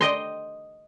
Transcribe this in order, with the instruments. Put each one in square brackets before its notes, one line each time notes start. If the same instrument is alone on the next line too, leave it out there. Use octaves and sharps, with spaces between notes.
[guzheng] D#5 G5 C6